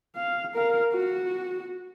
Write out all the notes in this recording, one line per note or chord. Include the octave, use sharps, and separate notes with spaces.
F5
A#4 F5
F#4